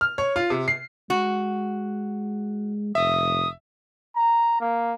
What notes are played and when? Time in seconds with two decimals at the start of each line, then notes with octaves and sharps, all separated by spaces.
0.01 F6
0.18 C#5
0.36 F4
0.50 C3
0.68 C7
1.10 G#3 F#4
2.95 F1 E5 D#6
4.16 A#5
4.61 A#3